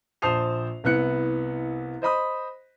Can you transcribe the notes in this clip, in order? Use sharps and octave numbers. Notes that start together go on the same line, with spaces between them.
A#1 C5 A5 D#6 C7 F7
C2 B3 E4 F#6 C#7
C5 D#5 B5 D#6